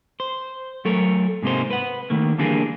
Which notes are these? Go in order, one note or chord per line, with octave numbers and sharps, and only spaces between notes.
C5
F#3 A3 A4 A#4 C#5
G#2 C3 A#3 D#4 C5
B4 F#5
D#3 A3 A#3
D3 E3 G3 A#3 D4 G#4